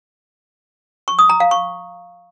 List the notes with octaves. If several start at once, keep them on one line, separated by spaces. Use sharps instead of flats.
C#6
D#6
A#5
F5
C#6